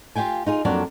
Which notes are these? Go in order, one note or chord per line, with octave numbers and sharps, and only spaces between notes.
F4 G4 F5 G5 G#5
D#4 F4 G#4
F2 F#3 A#3 D4 D5